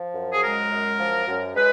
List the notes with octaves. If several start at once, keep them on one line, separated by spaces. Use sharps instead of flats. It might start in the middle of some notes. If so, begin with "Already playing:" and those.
Already playing: F3
F#2
G#4
G#3 A#4
F#2
F3
F#2
G#3 B4